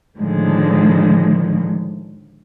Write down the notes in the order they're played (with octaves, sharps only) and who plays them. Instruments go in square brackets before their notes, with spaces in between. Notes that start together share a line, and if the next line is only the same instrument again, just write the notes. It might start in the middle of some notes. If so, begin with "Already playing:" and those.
[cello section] A2 D3 D#3 F3 G#3